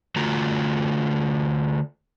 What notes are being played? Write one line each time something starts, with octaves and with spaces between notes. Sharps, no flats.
D3 A3 F4 F#4 A#5